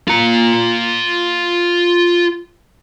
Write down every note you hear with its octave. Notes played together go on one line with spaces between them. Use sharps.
F4 A#5